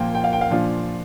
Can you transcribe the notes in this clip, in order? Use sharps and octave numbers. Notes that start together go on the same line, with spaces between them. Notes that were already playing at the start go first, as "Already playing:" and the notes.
Already playing: A#2 F3 A#3 F4 G5
G5
F5
G5
F5
A#2 F3 D4 F4